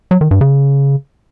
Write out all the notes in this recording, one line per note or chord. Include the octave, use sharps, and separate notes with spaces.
F#3
D#3
G2
C#3